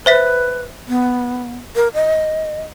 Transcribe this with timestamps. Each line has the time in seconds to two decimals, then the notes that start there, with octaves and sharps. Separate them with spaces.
0.06 B4 C5 E5 B6
0.88 B3
1.76 A#4
1.94 D#5